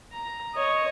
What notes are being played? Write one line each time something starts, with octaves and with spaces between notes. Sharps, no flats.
A#5
C#5 D#5